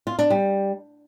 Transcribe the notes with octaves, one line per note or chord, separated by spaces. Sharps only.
F4
D4
G3